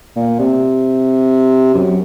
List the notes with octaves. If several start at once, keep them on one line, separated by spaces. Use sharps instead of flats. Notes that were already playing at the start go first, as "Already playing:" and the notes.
A#2
C3
F#2